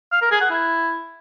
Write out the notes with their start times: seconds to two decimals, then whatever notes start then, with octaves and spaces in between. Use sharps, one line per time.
0.12 F5
0.22 A#4
0.31 G#4
0.41 F#5
0.50 E4